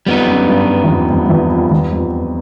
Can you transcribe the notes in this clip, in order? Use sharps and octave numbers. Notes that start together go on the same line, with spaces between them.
F2 G3 B3 D#4
F#2
G2
E2
F2
F2
F2
E2
F2
E2
F2